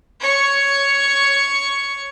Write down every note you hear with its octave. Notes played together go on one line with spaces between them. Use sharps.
C#5 C#6